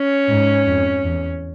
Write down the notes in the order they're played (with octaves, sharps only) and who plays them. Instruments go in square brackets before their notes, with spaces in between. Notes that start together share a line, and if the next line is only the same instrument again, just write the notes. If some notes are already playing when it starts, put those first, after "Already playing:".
Already playing: [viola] C#4
[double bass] G#2
F2
E2